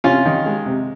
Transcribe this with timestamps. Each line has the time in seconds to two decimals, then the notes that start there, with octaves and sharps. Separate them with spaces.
0.04 C3 C#4 F4
0.26 D#3
0.46 G#3
0.66 C3